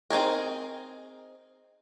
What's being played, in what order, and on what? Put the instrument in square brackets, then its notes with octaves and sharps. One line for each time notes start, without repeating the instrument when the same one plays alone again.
[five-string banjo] C4 D#4 G#4 A#4